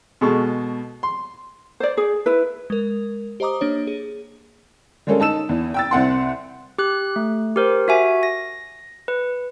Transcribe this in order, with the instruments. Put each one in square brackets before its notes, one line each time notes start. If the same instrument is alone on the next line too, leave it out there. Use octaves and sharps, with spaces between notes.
[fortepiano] B2 G#3 A4 C#6
C6
[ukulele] C5 D5
G#4
E4 B4
[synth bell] G#3 A#4
G4 C5 D#5 A#5 D6 D#6
A#3 D4 C#5
G#4
[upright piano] G3 G#3 A#3 C#4 A4
D#4 A5 E6 E7
E2
G5 E6 A6
C2 C4 F#5 C6
[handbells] G4 F#6
A3
G4 A#4 C5
F#4 E5 G#5
A#6
B4